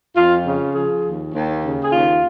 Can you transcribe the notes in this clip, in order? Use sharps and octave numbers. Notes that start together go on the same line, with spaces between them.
F2 F4
C#3
F3 G#4
D#2
D#2
C#3
G#4
D#2 F4